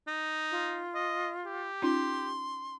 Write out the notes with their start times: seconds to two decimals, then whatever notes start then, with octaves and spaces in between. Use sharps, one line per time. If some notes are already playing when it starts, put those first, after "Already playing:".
0.07 D#4
0.51 F4
0.94 D#5
1.45 G4
1.82 C#4 D#4 F4 C6